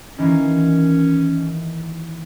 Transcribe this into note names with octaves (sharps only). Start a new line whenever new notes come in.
D#3 E3 A#3 C#4